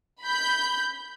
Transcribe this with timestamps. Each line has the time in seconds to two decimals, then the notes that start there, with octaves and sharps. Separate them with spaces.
0.22 B5 G6